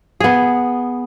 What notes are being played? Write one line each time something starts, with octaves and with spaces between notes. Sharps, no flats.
B3 G#4